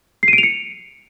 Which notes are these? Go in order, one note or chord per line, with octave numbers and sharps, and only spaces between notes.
C7
D#7
D7
F7
C#7